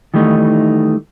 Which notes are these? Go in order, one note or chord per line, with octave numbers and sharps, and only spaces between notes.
D#3 E3 G3 A3 D#4